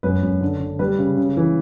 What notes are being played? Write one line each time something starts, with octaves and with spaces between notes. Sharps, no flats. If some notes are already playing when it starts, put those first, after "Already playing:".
F#2 B4
F#2
D3
D3
G3 B4
C#3
C#3
E3